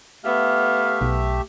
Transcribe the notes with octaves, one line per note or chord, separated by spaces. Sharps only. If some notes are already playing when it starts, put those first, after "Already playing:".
A3 B3 G4 E5 F5
B1